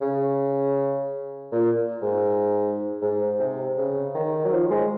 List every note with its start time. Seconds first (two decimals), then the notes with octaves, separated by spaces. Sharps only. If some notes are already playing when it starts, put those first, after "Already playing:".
0.01 C#3
1.52 A#2
2.02 G#2
3.02 G#2
3.39 C3
3.77 C#3
4.14 D#3
4.45 F#3
4.52 F3
4.71 G#3